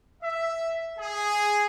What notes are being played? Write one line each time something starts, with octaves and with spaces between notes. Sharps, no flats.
E5
G#4